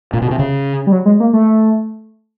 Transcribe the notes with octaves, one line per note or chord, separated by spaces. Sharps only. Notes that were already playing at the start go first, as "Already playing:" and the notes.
A#2
B2
C3
C#3
G3
F#3
G#3
A#3
A3